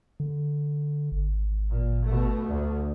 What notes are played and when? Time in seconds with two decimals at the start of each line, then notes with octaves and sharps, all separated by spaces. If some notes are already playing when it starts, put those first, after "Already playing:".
0.20 D3
1.12 G#1
1.71 A#2
2.06 B2 A3
2.49 D2